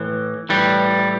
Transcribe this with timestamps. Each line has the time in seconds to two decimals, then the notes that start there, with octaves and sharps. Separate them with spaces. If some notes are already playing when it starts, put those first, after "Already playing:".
Already playing: A2 E3
0.49 A2 E3 G3